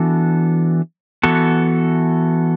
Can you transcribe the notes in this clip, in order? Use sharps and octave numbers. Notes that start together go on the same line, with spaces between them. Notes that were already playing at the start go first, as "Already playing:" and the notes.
Already playing: E3 B3 D4 F#4 A4
E3 B3 F#4 A4